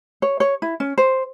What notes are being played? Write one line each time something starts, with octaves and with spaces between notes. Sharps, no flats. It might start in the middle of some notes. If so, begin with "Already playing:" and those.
C#5
C#5
E4
C#4
C5